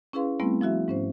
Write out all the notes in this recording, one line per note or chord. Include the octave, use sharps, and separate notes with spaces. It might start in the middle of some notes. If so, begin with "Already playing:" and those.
C#4 E4 G#4 B4 F5 C6
G3 A3 B3 C4 E4
F3 E4 F#4 E5
G#2 C#4 C5